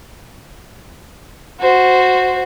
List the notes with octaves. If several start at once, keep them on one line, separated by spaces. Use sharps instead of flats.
F#4 C5